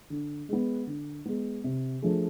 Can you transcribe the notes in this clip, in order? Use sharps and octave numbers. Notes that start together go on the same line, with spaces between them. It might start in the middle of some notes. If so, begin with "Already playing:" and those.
D3
G#3 B3
D3
G#3 B3
C3
F3 A3 D4 G#4